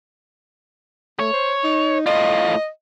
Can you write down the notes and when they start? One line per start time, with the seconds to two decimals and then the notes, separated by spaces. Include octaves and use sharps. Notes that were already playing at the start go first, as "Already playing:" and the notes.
1.19 A3 C#5
1.33 C5
1.64 D#4
2.06 A2 F4 D#5